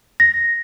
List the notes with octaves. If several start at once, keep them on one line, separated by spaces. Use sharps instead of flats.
A#6